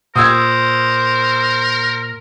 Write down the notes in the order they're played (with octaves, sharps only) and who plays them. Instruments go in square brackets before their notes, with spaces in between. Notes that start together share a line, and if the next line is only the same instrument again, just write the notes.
[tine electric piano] A#2 [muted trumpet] A#4 [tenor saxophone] C5 [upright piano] D#6 E6 G#6